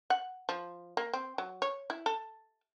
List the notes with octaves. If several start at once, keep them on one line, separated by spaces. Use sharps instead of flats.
F#5
F3
A#3
C4
F#3
C#5
E4
A4